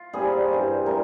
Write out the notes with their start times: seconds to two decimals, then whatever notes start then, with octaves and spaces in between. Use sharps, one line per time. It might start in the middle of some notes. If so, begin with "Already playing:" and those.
Already playing: F4
0.13 A#2 G3 C4 G#4
0.50 G2 E3 G3
0.86 A#2 G3 C4 A#4